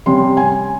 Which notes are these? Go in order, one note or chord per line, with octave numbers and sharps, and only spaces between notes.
C3 G3 C#4 C6
G#5